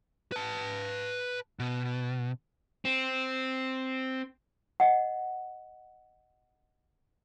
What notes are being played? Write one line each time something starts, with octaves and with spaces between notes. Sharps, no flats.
B4 A5
B2
C4
D#5 F#5